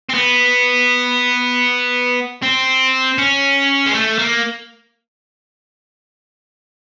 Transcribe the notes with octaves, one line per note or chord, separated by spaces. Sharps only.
C4
B3
C4
C#4
G#3
A3
A#3